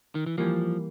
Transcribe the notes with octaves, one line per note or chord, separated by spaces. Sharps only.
D#3
E3
E3 F3 G3 A#3